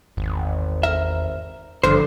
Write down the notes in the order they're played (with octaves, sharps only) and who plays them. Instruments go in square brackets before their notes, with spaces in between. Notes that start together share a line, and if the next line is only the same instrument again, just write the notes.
[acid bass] G#1 [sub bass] E2
[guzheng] A#4 [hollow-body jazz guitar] E5
[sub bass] G#1 [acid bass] G2 [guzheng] D3 F3 [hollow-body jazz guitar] C5